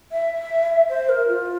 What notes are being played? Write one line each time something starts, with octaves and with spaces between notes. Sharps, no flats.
E5
C5
A#4
F4